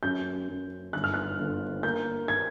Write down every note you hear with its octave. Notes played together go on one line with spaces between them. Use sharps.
F#2 G6
F#2
G1 F#6
F6
F#6
G1
A#3 G6
G#6